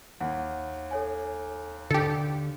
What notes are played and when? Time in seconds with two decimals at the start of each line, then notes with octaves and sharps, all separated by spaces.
0.20 D#2 F#5
0.91 A4 C#5 G#5
1.91 D3 G4 A4 C#7